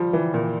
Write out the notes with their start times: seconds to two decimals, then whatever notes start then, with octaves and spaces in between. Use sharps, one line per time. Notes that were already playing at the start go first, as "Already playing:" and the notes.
Already playing: F3 G3
0.13 E3
0.34 A#2